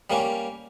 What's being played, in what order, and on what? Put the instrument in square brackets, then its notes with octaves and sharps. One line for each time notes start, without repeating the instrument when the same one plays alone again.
[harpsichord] G3 A#3 C#4